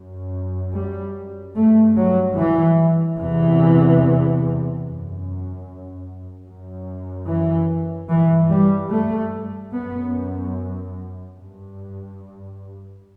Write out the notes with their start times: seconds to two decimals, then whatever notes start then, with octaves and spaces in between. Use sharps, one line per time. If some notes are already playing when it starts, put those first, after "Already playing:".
Already playing: F#2
0.74 G3
1.55 G2 A3
1.96 F#3
2.37 E3
3.19 E2 C3 E3
4.83 F#2
6.47 F#2
7.28 E3
8.10 G2 E3
8.50 G3
8.91 A3
9.73 F#2 B3
11.37 G2